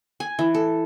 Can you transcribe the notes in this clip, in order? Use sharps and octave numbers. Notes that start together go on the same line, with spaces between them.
G#5
E3
A4